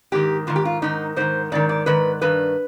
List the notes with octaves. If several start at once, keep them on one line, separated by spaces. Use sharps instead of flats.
G#2 D#3 G4
G#2 D#3 F4
G4
F4
G#2 D#3 D#4
G#2 D#3 C5
G#2 D#3 D5
D5
G#2 D#3 B4
G2 D#3 B4